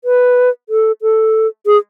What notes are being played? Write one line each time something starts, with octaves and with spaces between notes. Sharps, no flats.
B4
A4
A4
G#4